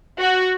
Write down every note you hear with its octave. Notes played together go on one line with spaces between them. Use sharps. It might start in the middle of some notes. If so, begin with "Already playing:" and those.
F#4